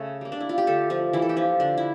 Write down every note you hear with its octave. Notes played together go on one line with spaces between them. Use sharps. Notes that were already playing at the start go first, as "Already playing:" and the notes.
Already playing: C#3 A3 A4
G3 A#3
D4
E4
F4
G4
D3 A3 A4
F3 F4
E3 G3 A#3 E4
A4
G4
F3 F4
D3 D4
E4